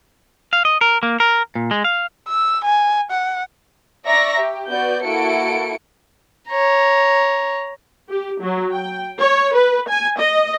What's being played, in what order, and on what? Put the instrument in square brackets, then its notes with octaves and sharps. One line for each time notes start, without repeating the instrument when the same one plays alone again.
[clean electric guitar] F5
D#5
A#4
A#3
A#4
A#2
G#3
F5
[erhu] E6
G#5
F#5
[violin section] D5 E5 A#5 C#6 A#6
G4
B3 F#4 D5 G6
A#3 E4 F#4 A4 C#7 D7
[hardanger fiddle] C#5 A#5
[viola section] G4
F#3
G5
C#5
B4
G#5
D#5